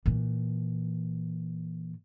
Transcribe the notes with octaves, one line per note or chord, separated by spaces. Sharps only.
A#2 E3